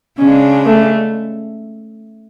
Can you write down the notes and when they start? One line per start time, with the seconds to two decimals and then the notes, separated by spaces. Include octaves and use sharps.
0.18 C#3 G#3 C#4 D4
0.65 A3